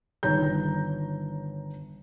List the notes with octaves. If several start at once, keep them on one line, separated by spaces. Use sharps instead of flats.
G1 D#3 C#5 A#5 G6